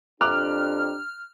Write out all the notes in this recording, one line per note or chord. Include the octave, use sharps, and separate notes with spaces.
F2 D4 G4 A#5 D6 F6 F#6